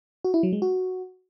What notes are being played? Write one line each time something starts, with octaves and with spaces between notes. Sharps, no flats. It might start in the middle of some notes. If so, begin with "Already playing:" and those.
F#4
E4
F#3
G#3
F#4